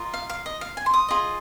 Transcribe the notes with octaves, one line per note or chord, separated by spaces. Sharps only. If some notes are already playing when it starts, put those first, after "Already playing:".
Already playing: F4 A#4 D#5
F5
F5
D#5
F5
G#5
C6
D#6
F4 G#4 D#5